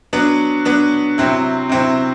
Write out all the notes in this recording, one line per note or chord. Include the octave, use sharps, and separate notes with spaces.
F#3 B3 D4
F#3 B3 D4
C3 F#3 C4 E4
C3 F#3 C4 E4